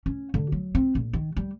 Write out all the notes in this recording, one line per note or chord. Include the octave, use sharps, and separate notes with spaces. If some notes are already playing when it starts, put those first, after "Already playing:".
C#4
D3
F#3
C4
A#1
D#3
G3